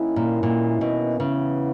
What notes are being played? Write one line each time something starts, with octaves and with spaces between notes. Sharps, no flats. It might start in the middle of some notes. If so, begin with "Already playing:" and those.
Already playing: D#3 A#3 C#4 E4
A#2
A#2
B2
C#3 E3 B3 E4